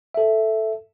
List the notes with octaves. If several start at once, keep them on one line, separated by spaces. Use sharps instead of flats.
A4 E5